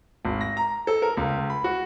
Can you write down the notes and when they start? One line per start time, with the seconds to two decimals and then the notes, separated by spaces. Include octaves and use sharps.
0.25 G#1
0.41 A#6
0.57 A#5
0.87 A4
1.02 A#4
1.17 C#2
1.50 B5
1.64 F#4